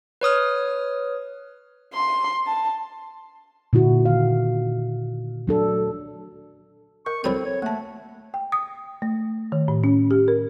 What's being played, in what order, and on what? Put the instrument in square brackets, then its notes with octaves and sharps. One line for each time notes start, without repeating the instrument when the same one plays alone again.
[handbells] B4 C#5 D#6 F6
[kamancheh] C6
A5
[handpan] A#2 D3 E4 F#4
D#3 F5
F#3 D4 A4
[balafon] A#4 [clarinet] C#6
[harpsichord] C2 F#3 D#6 [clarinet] C4 [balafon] A4 C5 B5
[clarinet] C#5
[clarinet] A3 [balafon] A#3 A5
[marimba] G5
D#6
A3
D#3
A2
C#4
G4
A#4